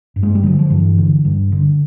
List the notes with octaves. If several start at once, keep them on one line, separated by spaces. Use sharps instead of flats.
G2
G#3
G3
D3 F#3
F3
G2 E3
D3
G2
D3